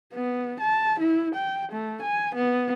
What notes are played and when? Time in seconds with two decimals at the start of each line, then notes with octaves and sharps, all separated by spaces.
0.13 B3
0.60 A5
1.00 E4
1.35 G5
1.72 A3
2.02 G#5
2.35 B3